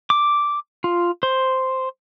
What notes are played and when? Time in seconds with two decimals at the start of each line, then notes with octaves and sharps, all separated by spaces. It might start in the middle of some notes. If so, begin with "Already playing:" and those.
0.10 D6
0.84 F4
1.23 C5